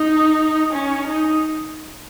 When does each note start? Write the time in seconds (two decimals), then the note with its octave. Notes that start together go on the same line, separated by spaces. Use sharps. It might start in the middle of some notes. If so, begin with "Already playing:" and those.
Already playing: D#4
0.73 C#4
1.07 D#4